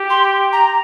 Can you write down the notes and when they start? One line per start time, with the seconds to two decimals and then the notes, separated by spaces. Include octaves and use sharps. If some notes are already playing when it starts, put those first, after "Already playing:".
Already playing: G4
0.10 C6
0.52 A#5